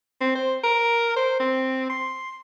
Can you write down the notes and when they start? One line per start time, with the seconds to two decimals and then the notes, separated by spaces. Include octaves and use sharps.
0.21 C4
0.35 C5
0.63 A#4
1.16 C5
1.40 C4
1.90 C6